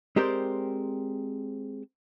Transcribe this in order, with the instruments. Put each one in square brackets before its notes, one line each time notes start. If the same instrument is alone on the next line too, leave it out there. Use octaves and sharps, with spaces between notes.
[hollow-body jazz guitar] G#3 C4 G4 A#4 C5 D5